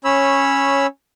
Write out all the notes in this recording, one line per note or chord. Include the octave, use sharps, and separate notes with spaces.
C#4 C#5 B5 E6